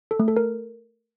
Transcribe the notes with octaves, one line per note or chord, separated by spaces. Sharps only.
A4
A3
A4
A#4